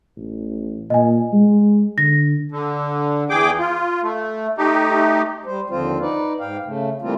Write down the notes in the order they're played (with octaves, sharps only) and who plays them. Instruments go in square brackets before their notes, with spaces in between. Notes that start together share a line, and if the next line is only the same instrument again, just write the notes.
[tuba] A1
[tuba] A#2 [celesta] D#5 G#5
[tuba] G#3
[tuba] D3 [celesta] A#6
[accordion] D3
E2 G#4 G5 D6
F4
A3
A3 D#4 G4
[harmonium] G3 C5
D#2 D3 F3 C4 F4 C5
D#4 B4 D5
G#2 F5 G5
C#3 A3
E3 G3 A3 A#3 C4 F4